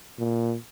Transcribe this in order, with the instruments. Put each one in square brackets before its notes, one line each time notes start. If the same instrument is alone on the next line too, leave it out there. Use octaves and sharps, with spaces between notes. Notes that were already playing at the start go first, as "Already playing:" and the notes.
[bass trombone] A#2